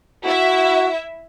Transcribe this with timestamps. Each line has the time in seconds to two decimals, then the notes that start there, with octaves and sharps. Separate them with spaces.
0.25 E4 F#4 E5